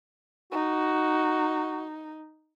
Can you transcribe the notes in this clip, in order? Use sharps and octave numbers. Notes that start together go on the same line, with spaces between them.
D#4 F#4